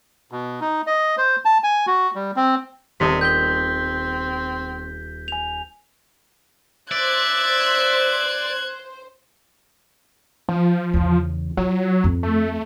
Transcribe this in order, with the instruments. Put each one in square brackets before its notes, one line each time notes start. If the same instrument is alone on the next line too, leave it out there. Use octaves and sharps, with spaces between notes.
[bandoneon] B2
D#4
D#5
C5
A5
G#5
F#4
G3
C4
[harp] D#1 D#5 A5 [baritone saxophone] C3 [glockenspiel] B6
[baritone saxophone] C4 [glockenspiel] G6 B6 G7
[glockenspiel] G#5 F7
[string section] C5 [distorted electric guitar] D5 [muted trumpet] E5 [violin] F#6 G#6
[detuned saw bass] F3
[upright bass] E2 C#3
[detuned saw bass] F#3 [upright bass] F4
[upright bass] F2
[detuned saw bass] A3